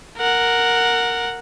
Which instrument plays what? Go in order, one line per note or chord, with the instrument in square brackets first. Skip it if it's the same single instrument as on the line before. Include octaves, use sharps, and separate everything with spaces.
[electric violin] A#4 F#5